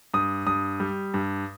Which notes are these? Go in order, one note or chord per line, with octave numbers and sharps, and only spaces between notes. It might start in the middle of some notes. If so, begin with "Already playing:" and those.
G2 D#6
G2 D#6
G3
G2